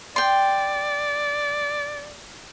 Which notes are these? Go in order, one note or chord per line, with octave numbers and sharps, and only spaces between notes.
D5 G5 C6